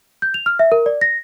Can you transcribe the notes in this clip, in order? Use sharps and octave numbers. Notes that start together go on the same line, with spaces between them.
G6
F7
F6
E5
A#4
D5
A#6